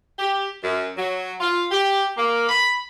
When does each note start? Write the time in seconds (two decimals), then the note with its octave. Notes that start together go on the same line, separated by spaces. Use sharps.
0.19 G4
0.63 F#2
0.97 F#3
1.39 F4
1.71 G4
2.17 A#3
2.49 B5